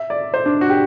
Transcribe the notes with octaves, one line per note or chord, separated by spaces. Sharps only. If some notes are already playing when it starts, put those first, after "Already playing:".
Already playing: E5
D5
C5
D4
F#4
G4